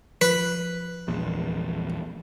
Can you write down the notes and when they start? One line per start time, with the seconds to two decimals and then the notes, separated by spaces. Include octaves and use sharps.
0.21 F3 B4
1.08 A#1 E2